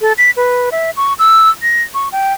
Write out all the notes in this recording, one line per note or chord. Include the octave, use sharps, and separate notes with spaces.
A4
B6
B4
E5
C#6
E6
A#6
C#6
G5